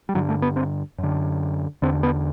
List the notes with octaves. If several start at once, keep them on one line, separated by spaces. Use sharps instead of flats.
G3
G2 D3 F#3
A3
B3
C4
F#2
D3
E2 D3 C4
B3